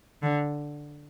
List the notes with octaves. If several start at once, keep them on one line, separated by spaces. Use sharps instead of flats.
D3